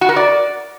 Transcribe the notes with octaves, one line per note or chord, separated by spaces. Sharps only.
F#4
A#4
D5